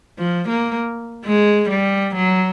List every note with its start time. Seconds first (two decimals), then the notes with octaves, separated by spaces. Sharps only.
0.18 F3
0.49 A#3
1.25 G#3
1.70 G3
2.15 F#3